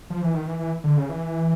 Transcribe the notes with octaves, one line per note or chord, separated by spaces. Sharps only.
F3
E3
D#3
E3
E3
D3
C#3
E3